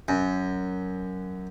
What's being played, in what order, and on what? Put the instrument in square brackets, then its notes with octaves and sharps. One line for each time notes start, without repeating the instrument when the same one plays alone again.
[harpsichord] F#2